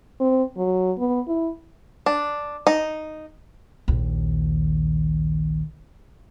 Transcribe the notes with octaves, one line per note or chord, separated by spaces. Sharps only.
C4
F#3
B3
E4
D4
D#4
A#1 D#2